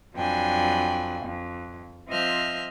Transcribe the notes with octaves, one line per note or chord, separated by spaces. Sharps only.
F2 F#3 D4 G5 G#5 B5
F2
F3 C4 D#5 E5 F6 G6